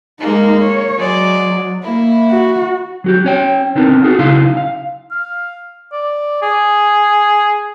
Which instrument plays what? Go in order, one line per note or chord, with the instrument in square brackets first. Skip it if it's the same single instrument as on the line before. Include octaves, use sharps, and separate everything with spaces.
[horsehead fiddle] G#3 D#4 [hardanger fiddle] A#3
[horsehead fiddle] C#5
[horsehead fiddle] F#3 [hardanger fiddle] G#3 D5
[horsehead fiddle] A#3 [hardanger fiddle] E4
[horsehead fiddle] F#4
[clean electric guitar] F#3 F#4 G4
C#4 C#5 G5
B3 C4 D4 D#4 A#4
F4 F#4 G#4 F#5
B1 C#3 D#4 E4 F5 C6
F5
[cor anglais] F5
D5
G#4